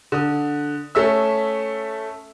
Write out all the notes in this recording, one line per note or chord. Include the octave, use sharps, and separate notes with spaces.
D3 D#6
A3 C#4 E5 E6